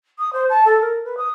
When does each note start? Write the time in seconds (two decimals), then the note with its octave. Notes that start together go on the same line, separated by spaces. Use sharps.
0.19 D#6
0.33 C5
0.49 A5
0.65 A4
0.81 A#4
1.05 B4
1.17 D#6